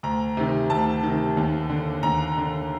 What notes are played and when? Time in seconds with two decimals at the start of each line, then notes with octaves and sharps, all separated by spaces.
0.03 D2 A#5
0.37 C3 D#3
0.70 D2 A5
1.03 C3 D#3
1.37 D#2
1.70 D3
2.03 D#2 A#5
2.37 D3